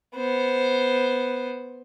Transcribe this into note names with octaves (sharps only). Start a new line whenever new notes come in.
B3 C5